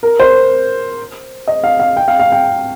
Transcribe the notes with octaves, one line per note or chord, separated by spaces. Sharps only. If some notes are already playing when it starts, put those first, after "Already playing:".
A#4
C5
D#5
F5
F5
G5
F5
F5
G5